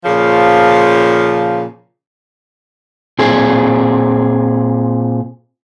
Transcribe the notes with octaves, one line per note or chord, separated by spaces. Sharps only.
A#2 C#3 F3
A#2 C4 G#4